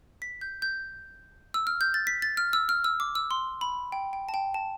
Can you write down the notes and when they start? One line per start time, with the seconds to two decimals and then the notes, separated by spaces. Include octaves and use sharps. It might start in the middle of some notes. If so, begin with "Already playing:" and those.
0.22 B6
0.41 G6
0.62 G6
1.54 E6
1.67 F6
1.81 G6
1.94 A6
2.07 B6
2.22 A6
2.37 F6
2.53 E6
2.69 F6
2.84 E6
3.00 D6
3.15 E6
3.31 C6
3.61 B5
3.92 G5
4.13 G5
4.29 A5
4.34 G5
4.54 A5